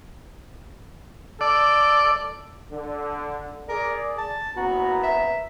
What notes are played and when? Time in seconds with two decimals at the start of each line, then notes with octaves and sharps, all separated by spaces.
1.41 A4 D5
2.72 D3
3.69 G#4 A#4 D5
4.18 A5
4.57 F#1 B3 F#4 A#5
5.03 E5